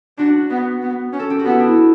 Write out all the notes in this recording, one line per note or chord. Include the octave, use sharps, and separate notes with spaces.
D4 F#4
B3
B3
C#4
A4
G4
F#4
B3
E4
D4